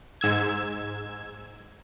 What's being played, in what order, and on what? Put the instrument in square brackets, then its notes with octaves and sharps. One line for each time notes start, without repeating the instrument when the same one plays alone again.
[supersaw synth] G#2 E6 G#6